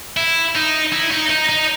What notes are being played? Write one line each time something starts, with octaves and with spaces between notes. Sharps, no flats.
E4
D#4
E4
D#4
D#4
D#4